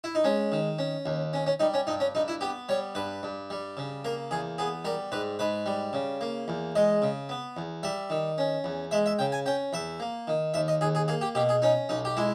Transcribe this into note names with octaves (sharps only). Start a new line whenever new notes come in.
E4
D#4
G#3 C#4
D#3
C#4
D#2
C#4
C#4
G3 D#4
C#4
G2 D#4
C#4
G2 D#4
E4
B3 G4
G3 C#5
G2 B4
G2
G3
C#3
A#3 A#4
E2 G#4
B3 G#4
G3 A#4
G#2 B4
G#2 B4
G3
C#3
A#3
E2
G#3 D#5
C#3
B3
E2
G3 E5
D#3
C#4
E2
G#3 E5
E5
C#3 G5
G#5
C#4 G5
E2 E5
A#3
D#3
D#2 E5
D#5
D#2 G#4
G#4
A#3 G#4
G4
B2 G4
G#4
C#4 D#4
B1 D#4
G4
G#3 E4